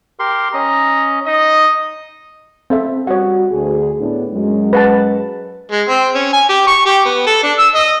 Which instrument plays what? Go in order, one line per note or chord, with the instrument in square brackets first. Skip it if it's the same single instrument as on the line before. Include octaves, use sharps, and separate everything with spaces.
[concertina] G4 A#4 C6
[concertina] C#4 D#5 [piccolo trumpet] A#5
[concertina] D#4 [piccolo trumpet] D#5
[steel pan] C4 A4 E5
[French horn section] G3 F#4 [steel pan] C#5 F#5
[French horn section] D2 G#4
A2 B3 D4
F#2 F#3 G#3
[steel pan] B4 F#5 A5
[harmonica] G#3
C4
C#4
G#5
G4
C#6
G4
B3
A4
D4
E6
D#5